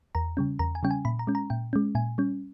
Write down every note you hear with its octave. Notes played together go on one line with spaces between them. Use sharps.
E2 A#5
C#3 G3 C#4
E2 A#5
G#5
C#3 G3 C#4 G5
G#5
A#2 B5
A#5
G#3 C#4
A#5
A#2 G5
G#3 C#4
A#2 G#5
G3 C#4